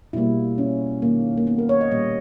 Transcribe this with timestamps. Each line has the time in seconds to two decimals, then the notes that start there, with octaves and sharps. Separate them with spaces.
0.13 B2 G3 A#3 E4
0.58 C#4
1.02 D#3 A#3
1.37 A#3
1.47 B3
1.58 A#4
1.69 C#5
1.81 D#5
1.91 A#2 G3 A#3 D#5